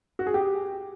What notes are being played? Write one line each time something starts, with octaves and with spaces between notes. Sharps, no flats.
F#4
G#4
G4